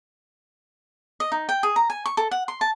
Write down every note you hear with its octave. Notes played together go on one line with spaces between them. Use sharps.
D#5
D#4
G5
G#4
A#5
G#5
C#6
A4
F#5
C6
A5